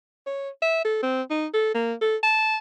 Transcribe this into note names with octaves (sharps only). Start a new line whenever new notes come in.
C#5
E5
A4
C4
D#4
A4
A#3
A4
A5